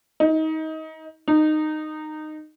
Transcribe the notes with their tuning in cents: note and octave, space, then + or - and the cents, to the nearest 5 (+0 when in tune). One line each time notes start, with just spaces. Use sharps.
D#4 +25
D#4 -15